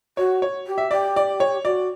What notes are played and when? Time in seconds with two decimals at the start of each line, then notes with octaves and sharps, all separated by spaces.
0.17 F#4 C#5
0.42 C#5
0.67 G4
0.78 E5
0.91 G4 D5
1.16 D5
1.40 C#5
1.65 F#4 D5